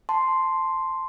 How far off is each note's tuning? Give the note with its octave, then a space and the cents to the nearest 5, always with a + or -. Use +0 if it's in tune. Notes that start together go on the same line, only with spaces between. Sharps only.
A5 +0 C6 +0